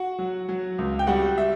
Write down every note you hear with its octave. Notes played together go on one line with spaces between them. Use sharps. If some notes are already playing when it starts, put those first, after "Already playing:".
Already playing: F#4 F#5
F#3
F#3
C#2
G5
G3 F#4 F#5
E5